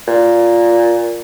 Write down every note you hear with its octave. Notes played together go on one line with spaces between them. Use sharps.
A#2